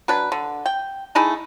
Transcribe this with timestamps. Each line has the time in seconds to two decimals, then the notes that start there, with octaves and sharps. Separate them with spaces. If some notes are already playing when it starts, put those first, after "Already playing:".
0.08 F#3 D4 B4
0.32 D3
0.66 G5
1.15 A3 D#4 E4 G#4